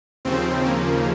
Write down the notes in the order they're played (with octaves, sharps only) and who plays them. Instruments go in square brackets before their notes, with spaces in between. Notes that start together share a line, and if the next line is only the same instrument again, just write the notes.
[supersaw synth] D#2 C#3 F3 C4
A#3